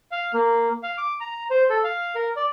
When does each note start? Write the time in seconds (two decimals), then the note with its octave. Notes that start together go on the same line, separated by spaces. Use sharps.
0.11 F5
0.34 A#3
0.83 F5
0.98 D6
1.20 A#5
1.50 C5
1.70 A4
1.84 F5
2.15 A#4
2.36 D5